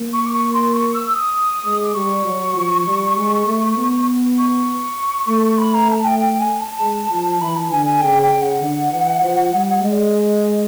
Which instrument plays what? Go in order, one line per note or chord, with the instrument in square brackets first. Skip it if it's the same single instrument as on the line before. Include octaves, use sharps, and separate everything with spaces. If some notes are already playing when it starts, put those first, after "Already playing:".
Already playing: [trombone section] A#3
[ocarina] C#6
D6
C#6
C6
C#6
E6
D#6
[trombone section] G#3
[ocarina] D6
[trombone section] G3 [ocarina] C#6
[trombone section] F#3
F3
G3
G#3
A3
B3
[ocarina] C#6
[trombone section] A3
[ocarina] B5
A#5
A5
G5
G5
G#5
A5
[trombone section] G#3
F3
[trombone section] E3 [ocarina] B5
[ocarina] A5
[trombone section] D3 [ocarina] G#5
[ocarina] G#5
[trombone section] C#3 [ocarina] G5
[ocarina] G5
[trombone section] C#3
[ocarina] F#5
[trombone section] D3
E3
F3
G3
[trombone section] G#3 [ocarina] D#5
[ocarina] D5
D#5